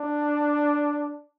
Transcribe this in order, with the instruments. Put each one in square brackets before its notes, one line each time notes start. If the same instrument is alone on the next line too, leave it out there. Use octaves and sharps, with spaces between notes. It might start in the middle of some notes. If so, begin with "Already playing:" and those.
Already playing: [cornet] D4